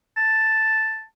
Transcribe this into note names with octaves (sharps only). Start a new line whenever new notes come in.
A5